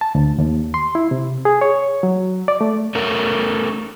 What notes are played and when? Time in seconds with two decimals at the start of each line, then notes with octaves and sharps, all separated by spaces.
0.01 A5
0.15 D2
0.38 D#2
0.74 C6
0.95 E4
1.11 C3
1.45 G#4
1.61 C#5
2.03 F#3
2.48 D5
2.61 A3
2.95 A3 C#4 A#4